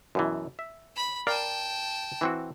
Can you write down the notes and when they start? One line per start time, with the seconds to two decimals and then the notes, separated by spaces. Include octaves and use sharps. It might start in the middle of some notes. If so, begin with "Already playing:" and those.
0.15 F#2 B2 E3
0.59 E5
0.96 B5
1.27 A#4 D5 F5 G5 A5
2.21 E3 C4 F#4